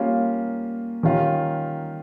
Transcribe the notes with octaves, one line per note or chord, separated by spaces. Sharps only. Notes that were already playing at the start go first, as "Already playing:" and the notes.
Already playing: G3 A#3 C#4 F4
D#3 G3 C#4 F4